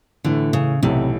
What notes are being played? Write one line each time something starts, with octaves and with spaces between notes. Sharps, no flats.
A2 D3 E3 A3
C#3
B1 A2 C3 E3 A3